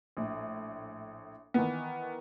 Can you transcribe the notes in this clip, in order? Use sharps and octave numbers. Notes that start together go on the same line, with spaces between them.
A#1 A2
D#3 E3 B3